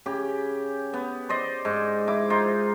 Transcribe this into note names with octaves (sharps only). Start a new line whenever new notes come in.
C#3 G4
B3
C5 D5 D#5
G#2
E4 D6
D#4 F4 C5